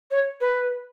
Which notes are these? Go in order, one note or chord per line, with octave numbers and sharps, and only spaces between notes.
C#5
B4